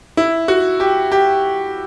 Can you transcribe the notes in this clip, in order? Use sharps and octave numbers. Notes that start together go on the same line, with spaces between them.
E4
F#4
G4
G4